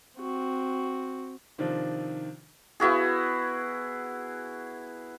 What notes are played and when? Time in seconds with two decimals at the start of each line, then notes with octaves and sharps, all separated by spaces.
0.19 C4 F#4
1.58 C3 D#3 F3 D4 F4
2.80 B3 E4 F#4 G#4